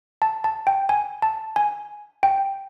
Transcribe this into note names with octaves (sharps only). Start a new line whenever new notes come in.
A5
A5
G5
G#5
A5
G#5
G5